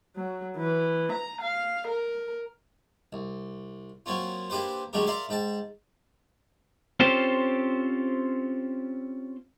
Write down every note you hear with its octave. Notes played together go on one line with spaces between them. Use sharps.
F#3
E3
A#5
F5
A#4
C2
F#3 A#3 C4 C#4 F4
A#3 D4 G4 B4 C5
D3 F#3 G#3 A3 G4 A#4
A#4 D5 E5 F5 C6
G#2 G5 A5
C4 C#4 F4 G4 A4 C5